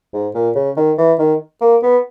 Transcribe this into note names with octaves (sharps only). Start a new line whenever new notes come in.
G#2
A#2
C#3
D#3
E3
D#3
A#3
B3